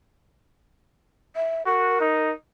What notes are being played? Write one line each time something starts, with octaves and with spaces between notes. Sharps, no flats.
E5
F#4 A#4
D#4